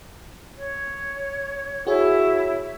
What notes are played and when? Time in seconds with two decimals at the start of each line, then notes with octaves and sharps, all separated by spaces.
0.57 C#5
1.87 E4 F#4 G#4 C#5